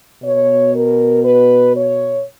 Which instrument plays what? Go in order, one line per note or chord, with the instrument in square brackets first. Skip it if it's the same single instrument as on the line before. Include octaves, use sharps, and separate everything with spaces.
[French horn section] B2 C#5
A#4
B4
C#5